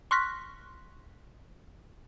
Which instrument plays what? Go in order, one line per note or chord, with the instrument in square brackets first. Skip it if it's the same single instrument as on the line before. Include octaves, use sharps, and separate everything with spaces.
[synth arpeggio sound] C6 C#6 F6 F#6 A#6 B6